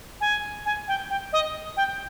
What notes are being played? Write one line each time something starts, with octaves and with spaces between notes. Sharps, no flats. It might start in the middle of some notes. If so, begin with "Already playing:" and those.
G#5
G#5
G5
G5
D#5
G5